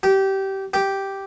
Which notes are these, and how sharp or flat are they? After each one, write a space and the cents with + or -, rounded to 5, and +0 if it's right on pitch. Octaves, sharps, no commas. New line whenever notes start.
G4 -20
G4 -5